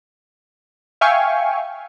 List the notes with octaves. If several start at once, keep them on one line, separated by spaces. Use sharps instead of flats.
E5 F5 G5 G#5 C#6